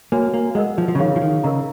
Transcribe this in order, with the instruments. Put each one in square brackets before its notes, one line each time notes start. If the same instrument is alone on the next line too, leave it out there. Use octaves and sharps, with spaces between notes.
[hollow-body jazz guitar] A#3 [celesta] F#4 C#5 G#5
[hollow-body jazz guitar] A#3
[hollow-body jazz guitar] G#3 [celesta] A#4 D#5 F#5
[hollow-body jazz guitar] F3
F3
C#3
[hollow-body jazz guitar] D#3 [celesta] G#4 C#5 F5
[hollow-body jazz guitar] F3
D#3
[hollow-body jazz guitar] C#3 [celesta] A#4 D#5 A#5